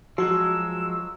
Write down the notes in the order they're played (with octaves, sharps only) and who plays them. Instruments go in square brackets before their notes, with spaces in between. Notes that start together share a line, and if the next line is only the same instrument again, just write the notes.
[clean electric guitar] F3 F#3 G#3 [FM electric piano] F#4 [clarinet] E6